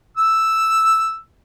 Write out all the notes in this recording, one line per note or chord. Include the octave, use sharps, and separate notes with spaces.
E6